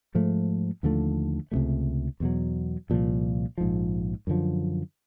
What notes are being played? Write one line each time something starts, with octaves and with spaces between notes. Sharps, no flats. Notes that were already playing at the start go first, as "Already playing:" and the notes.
G#2 F3 A3
D#2 D3 F3 A3
C#2 C3 E3 A3
E2 B2 F#3
C2 A#2 F3
A#1 G#2 F3
F#2 D3 F3